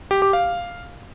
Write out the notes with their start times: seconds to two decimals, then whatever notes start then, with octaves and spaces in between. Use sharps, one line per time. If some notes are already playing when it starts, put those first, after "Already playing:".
0.11 G4
0.22 G4
0.33 F5